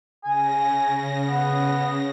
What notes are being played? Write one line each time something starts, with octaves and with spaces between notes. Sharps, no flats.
C#3 G#5 A#6
B3